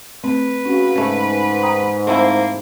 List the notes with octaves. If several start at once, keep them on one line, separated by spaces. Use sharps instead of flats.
A3 C4 B4
C#3 C#4 F#4
G#2 C#3 A3
G5 A#5 D#6
A3 A#3 C4 E4 C6